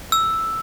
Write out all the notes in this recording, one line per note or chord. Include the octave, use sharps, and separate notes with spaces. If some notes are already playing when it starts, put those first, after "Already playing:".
E6